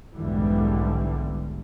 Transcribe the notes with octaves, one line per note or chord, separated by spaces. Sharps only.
B1 F2 G#2 D3 E3 G3